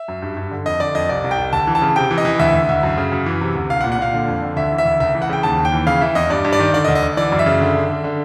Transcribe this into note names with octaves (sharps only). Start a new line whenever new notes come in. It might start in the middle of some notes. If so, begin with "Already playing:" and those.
Already playing: E5
F#2
G2
G2
D3
F2 D#5
D3 D5
F2 D#5
C2 D5
C2
G5
C2
D2 A5
E3
A5
C#3
C3 G5
E3
D#5
E3
D2 E5
D2
D2
F#2
C#3
F#2
E3
C3
D2
C2 F5
F#5
A#2
F#5
A#2 F5
D3
F2
D3
D2 E5
E3
E5
D2
C#2 E5
E3
F#5
C#3 G5
D#2 A5
D#2
G5
E3
C#3 F5
E3 E5
E2 D#5
G2 D5
G2
D5
D#3
D3 D5
D#5
D2
D#5
D2
E3 D5
F#2
E5
C#3
D3
D3
D3
D3